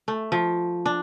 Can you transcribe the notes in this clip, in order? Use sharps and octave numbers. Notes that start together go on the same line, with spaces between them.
A3
F3
D4